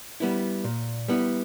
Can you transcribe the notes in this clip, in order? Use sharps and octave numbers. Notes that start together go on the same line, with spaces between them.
G3 B3 E4
A#2
G3 B3 E4